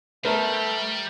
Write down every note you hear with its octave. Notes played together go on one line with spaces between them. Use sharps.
G3 A3 B3 A#4